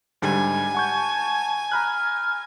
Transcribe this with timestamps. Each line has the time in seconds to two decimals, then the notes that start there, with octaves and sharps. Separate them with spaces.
0.22 G#2 D3 G3 G#5
0.75 F#5 A5 C#6 G6
1.72 A#5 B5 F6 F#6